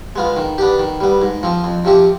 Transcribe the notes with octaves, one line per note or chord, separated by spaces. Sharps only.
G#3 B3 F4
D#3
B3 D4 G4
D#3
G3 B3
G#2
F3 C4
F2
C3 F3 C4 G4